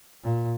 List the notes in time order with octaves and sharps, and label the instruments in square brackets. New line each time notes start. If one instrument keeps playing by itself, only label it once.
[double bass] A#2